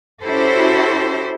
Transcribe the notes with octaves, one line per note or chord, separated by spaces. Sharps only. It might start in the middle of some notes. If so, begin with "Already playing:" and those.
C#4 E4 F#4 G4 A4 C5